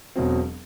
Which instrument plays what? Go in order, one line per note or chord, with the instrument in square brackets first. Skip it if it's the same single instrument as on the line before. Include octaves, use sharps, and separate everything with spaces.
[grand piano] E1 E2 B2 F#3 C4